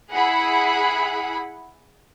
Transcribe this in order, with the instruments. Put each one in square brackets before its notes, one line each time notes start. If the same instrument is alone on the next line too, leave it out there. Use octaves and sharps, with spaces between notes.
[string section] E4 G#4 F#5 B5